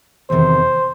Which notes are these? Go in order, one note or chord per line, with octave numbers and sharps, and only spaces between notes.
E2 C3 D#3 C5